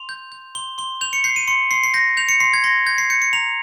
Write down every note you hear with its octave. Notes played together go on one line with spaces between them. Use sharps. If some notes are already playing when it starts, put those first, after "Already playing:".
Already playing: C6 F7
G6
G6
C6 G7
C6 G7
G6 F7
C#7
G6 C7
D#7
C6 C#7
C6 C7
C7
G6 A#6
G6 F7
C#7
C6 C7
G#6
C6 A#6
G6 G#6
C7
G6 C#7
C#7
A#5 F7